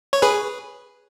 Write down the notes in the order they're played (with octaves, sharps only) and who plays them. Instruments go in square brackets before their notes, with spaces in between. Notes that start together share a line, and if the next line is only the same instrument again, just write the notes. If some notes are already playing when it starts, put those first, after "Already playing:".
[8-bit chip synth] C#5
G#4 B4